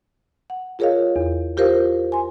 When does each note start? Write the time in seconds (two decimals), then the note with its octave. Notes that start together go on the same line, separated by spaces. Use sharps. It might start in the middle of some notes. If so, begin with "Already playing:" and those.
0.50 F#5
0.79 F4 G#4 A#4 C#5 D#5 F5
1.16 E2
1.57 F4 G4 A#4 C5 F5
2.12 G#5 C6